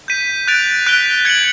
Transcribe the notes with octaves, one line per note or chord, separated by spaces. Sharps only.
G6 B6 D#7
F#6 A6 D7 F7
F#6 B6 D7 G7
G#6 C#7 F#7